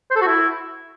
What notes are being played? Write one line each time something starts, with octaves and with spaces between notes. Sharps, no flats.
C5
A4
F#4
E4